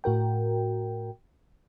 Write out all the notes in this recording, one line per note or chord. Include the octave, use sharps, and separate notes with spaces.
A2 F#4 A#4 G5